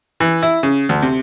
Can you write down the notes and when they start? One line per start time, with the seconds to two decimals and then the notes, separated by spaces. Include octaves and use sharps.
0.20 E3
0.43 E4
0.63 C#3
0.89 D2
1.02 C3